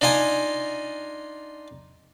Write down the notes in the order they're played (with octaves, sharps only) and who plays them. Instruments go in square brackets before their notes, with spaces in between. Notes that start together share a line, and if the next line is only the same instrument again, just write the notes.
[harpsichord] D4 D#4 F4 D#5 G#5